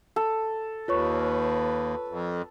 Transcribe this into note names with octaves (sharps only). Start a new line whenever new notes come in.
A4
D#2 F4 B4 C#5 C#6
F2